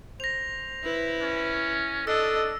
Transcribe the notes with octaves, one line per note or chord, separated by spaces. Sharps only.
C5 A#6 F7
E4 B4
C#4
D4 A4 D#5 E6